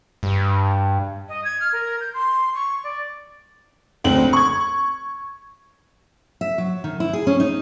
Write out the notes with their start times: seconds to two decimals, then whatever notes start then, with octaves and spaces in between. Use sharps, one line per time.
0.23 G2
1.28 D#5
1.44 G#6
1.60 F6
1.72 A#4
2.00 G6
2.13 C6
2.54 C#6
2.83 D5
4.04 F#1 D2 C4 F#7
4.33 C#6 G#6
6.41 E5
6.58 F#3
6.84 D#3
7.00 E4
7.13 G#4
7.27 C#4
7.40 D#4